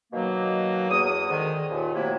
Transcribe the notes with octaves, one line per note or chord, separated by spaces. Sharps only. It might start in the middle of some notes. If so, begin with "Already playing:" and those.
B2 D#3 F#3 A#3
E2 F#3 D#6
G#2 D3 D#3
D#2 A#2
C3 F#3 A3 A#3 E4